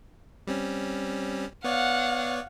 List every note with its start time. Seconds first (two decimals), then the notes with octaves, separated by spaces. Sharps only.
0.47 G3 C4 C#4
1.64 B3 C#5 D5 F5 F#5